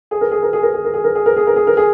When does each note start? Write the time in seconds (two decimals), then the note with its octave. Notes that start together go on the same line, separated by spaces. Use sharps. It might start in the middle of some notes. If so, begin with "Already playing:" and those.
0.11 G#4
0.21 A#4
0.31 G#4
0.43 A#4
0.53 G#4
0.63 A#4
0.74 G#4
0.84 A#4
0.94 G#4
1.04 A#4
1.15 G#4
1.26 A#4
1.37 G#4
1.47 A#4
1.56 G#4
1.67 A#4
1.77 G#4